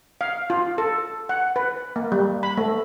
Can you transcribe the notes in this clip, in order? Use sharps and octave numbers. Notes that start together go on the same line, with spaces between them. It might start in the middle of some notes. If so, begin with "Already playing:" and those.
F5
F4
A4
F#5
B4
A#3
G3
B5
A3